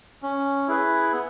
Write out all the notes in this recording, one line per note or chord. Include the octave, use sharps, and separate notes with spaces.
C#4
E4 G#4 B4
B3